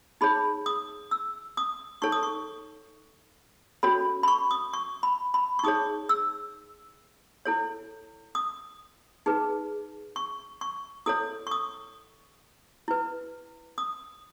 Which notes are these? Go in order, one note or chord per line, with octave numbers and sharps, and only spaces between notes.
D#4 G#4 C#5 B5
D#6
E6
D#6
D#4 A4 C#5 C#6
D#6
C#6
C#4 F#4 A4 C#5 B5
B5
C#6
D#6
C#6
B5
B5
C#6
D#4 G#4 C#5 D#6
E6
E4 A4 C#5
D#6
D#4 G#4 B4
C#6
C#6
E4 A4 C#5 D#6
C#6
D#6
E4 B4
D#6